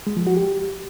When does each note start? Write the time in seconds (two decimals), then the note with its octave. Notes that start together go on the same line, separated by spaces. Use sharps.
0.07 G#3
0.17 F3
0.27 F#4
0.37 G4